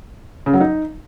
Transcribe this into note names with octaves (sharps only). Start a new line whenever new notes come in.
C#3
F#3
D#4